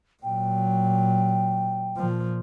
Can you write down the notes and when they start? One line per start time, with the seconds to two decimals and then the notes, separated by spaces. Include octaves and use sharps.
0.23 A#2 F#3 G5
1.97 A#2 F3